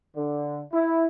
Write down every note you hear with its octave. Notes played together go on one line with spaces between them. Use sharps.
D3
E4